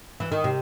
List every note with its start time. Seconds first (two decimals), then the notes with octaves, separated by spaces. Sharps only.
0.20 E3
0.32 D#3
0.44 C3